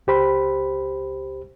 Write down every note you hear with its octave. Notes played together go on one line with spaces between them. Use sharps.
C#2 G4 C5 B5